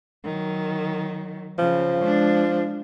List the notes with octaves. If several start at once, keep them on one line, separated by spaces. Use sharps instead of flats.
D#3 F#3
C#3 F3
G#3 D4